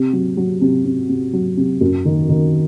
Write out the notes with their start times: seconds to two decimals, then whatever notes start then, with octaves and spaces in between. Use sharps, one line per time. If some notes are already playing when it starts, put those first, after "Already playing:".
Already playing: C3
0.13 F#3
0.37 F#3
0.62 C3
0.85 C3
1.09 C3
1.33 F#3
1.57 C3
1.81 F#2
2.05 D#3
2.29 D#3